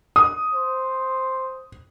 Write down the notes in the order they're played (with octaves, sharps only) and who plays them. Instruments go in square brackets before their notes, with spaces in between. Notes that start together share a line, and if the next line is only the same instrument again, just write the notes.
[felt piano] D#6
[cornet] C5